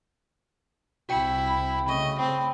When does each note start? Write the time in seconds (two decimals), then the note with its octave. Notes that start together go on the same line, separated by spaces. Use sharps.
1.09 C2 E4 F#4 G5 C#7
1.49 B5
1.88 C#3 A3 D#5 C#6
2.19 C4 G5 B5